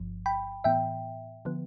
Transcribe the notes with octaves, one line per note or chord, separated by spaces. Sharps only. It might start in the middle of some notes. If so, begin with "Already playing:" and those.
Already playing: G1 G2 F3
G5 B5
A2 E3 B3 E5 G5
D3 F3 B3